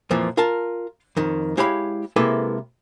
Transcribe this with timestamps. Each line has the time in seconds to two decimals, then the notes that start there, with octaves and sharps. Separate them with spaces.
0.11 F2 A#2 E3 F3
0.37 F4 A#4 A5
1.17 F2 D#3
1.57 G#3 E4 G4 C#5 F5 B5
2.16 C3 G#3 A#3 E4 A4 B4